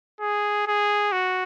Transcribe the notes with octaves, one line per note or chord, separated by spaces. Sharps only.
G#4
G#4
F#4